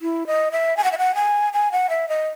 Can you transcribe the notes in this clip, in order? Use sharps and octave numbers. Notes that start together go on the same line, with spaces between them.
E4
D#5
E5
G#5
F#5
E5
F#5
G#5
G#5
F#5
E5
D#5